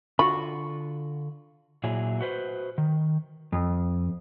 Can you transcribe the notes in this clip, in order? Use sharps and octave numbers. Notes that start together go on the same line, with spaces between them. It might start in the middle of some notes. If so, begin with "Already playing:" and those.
D3 F4 F#4 B5 C#6
A#2 F#3 E4 G#4
F#4 B4 C5
D#3
F2